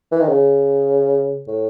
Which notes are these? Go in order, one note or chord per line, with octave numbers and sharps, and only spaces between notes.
E3
D#3
C#3
A2